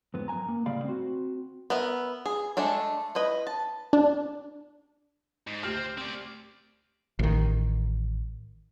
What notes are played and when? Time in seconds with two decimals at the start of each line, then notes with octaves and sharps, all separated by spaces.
0.14 F2 G#2 B3
0.28 F#2 G#5 A#5
0.49 A#3
0.66 A2 C#3 G3 D5 F5 B5
0.85 C4 F#4
1.70 B3 A#4 E5
2.26 G#4
2.57 G#3 A3 D4 A4
3.15 E4 B4 D#5
3.47 A5
3.93 D4
5.47 G#2
5.63 D2 C4 G4 F6
5.97 C4 D5
7.19 A1 D#3